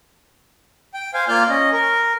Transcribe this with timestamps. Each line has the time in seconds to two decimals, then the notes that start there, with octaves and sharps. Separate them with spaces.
0.94 G5
1.14 C5 F5 G#5
1.28 A#3 F4 D5 F6 G6
1.49 C#4 D#5
1.72 A#4